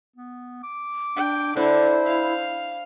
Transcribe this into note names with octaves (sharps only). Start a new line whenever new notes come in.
B3
D6
D4 G5
D3 D4 E4 C5
F5